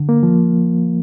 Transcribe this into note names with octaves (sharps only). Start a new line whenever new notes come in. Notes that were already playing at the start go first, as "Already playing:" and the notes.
Already playing: D3
A#3
F3